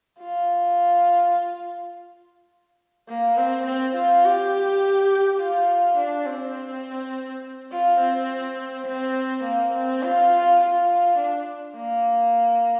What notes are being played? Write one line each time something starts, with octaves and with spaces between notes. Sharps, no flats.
F4
A#3
C4
C4
F4
G4
F4
D4
C4
F4
C4
C4
A#3
C4
F4
F4
F4
D4
A#3